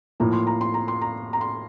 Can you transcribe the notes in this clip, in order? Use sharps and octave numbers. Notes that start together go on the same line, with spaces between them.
A2 F3 A#3 A#5
C6
A#5
C6
A#5
C6
A#5
A#5
C6